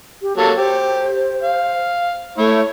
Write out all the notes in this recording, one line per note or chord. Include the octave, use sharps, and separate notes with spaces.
G4
F#3 A#3 A4 A5
G4 C5
F5
A3 E4 C#5